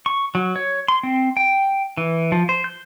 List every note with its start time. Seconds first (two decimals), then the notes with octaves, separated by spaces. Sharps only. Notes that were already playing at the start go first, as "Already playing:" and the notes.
0.06 C#6
0.35 F#3
0.56 C#5
0.88 C6
1.03 C4
1.37 G5
1.97 E3
2.32 F3
2.49 C5
2.64 G6